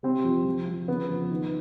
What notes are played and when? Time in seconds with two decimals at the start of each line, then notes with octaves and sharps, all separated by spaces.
0.03 C3 C4
0.25 F2
0.45 F3
0.68 F3
0.88 C#3 B3
1.10 F2
1.30 D#3